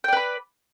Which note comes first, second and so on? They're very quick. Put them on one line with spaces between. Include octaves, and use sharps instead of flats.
G5 D5 B4 B5